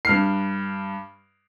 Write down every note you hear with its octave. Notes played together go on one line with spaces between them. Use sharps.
G2 F6 C7